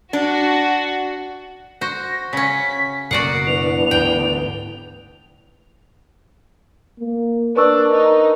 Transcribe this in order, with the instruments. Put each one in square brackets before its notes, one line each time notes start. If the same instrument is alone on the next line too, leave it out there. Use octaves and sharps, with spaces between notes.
[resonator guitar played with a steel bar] D4 [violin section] F#4
[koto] F#4 C5 [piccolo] A#6
[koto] C#3 C#4 [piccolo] B6
[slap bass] F#1 B2 [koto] F#4 D5 F#5 [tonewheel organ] A#4 [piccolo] C7
[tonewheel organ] E3 B3 D4 [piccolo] F7
[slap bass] D2 G#2 [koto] G5
[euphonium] A#3
[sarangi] D4 [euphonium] A#4 [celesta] B4 C#6 E6
[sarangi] D#4